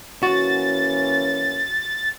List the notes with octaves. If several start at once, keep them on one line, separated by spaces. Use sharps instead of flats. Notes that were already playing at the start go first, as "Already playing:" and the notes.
E3 A#3 C#4 F#4 A6